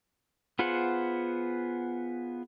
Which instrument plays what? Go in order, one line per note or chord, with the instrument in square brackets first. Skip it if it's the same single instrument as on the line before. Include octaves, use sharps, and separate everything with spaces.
[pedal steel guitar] B3 F4 G#4 C5 F#5